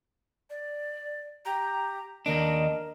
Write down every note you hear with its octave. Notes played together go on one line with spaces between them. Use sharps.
D5
G4 A#5
D#2 D4 A#4 D#5